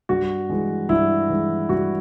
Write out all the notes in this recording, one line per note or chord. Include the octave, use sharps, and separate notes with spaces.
G2 F#4
E3 G#3
G2 E4
E3 G#3
G2 F#4